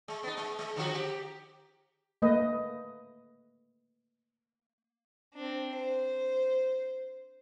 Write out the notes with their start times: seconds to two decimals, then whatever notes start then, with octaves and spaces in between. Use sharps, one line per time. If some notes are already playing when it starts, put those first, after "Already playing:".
0.08 G#3
0.23 B3 D#4
0.37 G#3
0.59 G#3
0.76 D3 F3 F#4
0.94 G4
2.22 A3 A#3 B4 D#5
5.34 C4 D4
5.75 C5